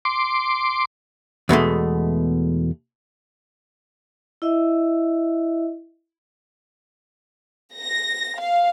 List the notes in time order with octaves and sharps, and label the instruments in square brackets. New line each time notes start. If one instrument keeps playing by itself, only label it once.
[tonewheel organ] C6 D6
[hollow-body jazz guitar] E2 B2 G#3 A3
[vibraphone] E4 D#5 E5
[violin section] A#6
F5